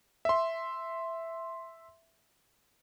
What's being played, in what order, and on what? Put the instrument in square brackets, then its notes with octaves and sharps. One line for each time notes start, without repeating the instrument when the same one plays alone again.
[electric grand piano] E5 C6